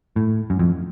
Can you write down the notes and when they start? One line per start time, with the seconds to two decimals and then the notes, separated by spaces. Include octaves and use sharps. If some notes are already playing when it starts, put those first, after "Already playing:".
0.16 A2
0.50 F#2
0.59 F2